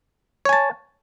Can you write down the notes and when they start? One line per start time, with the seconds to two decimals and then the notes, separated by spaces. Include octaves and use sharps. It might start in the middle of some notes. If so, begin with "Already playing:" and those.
0.45 C#5
0.49 G#5
0.53 A5